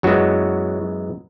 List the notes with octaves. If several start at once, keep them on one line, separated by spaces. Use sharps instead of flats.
F#2 E3 F#3 G#3 B3 F#4